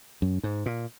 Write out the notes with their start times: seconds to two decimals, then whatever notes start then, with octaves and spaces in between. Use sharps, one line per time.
0.22 F#2
0.43 G#2
0.66 A#2